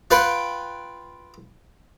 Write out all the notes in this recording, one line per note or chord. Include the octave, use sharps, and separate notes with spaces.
F4 B4 F#5 G5